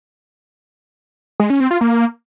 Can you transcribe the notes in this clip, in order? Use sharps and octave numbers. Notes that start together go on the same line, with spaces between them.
G#3
C#4
C4
F4
A#3